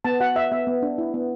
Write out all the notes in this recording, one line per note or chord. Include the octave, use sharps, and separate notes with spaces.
B3 A5
F#4 F#5
F#4 E5
B3 E5
B3
D4
E4
B3